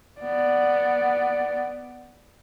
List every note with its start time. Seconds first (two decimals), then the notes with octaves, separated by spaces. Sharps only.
0.21 B3 D5